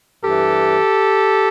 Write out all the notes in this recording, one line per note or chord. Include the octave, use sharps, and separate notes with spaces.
G2 E3 G4 A4